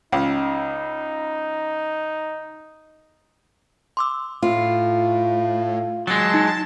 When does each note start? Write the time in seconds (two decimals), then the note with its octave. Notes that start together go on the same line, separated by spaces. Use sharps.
0.12 C#2 D#4
3.97 C6 D6 E6
4.43 A2 F4
6.07 F#3 G#3 A5
6.34 D#4